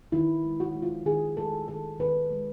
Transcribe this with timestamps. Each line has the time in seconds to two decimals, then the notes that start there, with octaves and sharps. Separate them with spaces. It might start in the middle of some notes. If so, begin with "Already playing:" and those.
0.12 D#3 E4
0.44 G#3
0.60 F#4
0.75 G#3
0.82 F4
1.06 D#3 G#4
1.37 G#3 A4
1.68 D#3 A4
1.99 D#3 B4
2.30 G#3